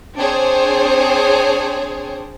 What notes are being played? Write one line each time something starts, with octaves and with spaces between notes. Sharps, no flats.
C4 D4 G#4 C5 C#5